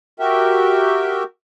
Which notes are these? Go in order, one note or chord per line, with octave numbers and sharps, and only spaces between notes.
F#4 G4 A#4 E5 G5